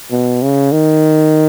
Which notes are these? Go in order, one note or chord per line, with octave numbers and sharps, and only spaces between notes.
B2
C#3
D#3